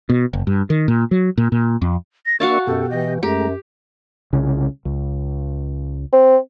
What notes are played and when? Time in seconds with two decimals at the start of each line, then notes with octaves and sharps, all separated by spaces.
0.10 B2
0.33 F#1
0.47 G2
0.70 D#3
0.88 A#2
1.11 F#3
1.38 A#2
1.52 A#2
1.82 F2
2.26 A#6
2.40 A#3 D4 F#4 E5 F5 A5 C#6
2.67 F#2 B2 G4 A4
2.90 E3 D#5
3.23 F#2 G#3 A3 G4 A#5
4.33 C2 C#3
4.85 C#2
6.13 C4